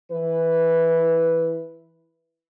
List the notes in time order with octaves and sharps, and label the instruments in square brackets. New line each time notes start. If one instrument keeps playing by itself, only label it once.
[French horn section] E3 E4 B4